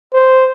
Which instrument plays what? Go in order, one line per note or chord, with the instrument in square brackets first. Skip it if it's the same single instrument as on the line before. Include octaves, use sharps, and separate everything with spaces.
[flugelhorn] C5